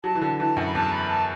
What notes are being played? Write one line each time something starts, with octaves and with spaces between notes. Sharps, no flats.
F#3 A5
E3
D3 A5
E3 A5
F#2 F#5
B5
E2 A5
B5
A5